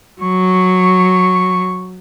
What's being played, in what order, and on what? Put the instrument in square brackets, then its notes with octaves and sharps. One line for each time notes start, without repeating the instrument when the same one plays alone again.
[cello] F#3 [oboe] C#6